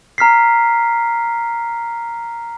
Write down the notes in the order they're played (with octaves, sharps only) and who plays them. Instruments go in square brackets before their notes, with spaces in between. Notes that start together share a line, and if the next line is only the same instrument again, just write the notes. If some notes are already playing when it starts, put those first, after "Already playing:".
[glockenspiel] A#5 F6 B6 C7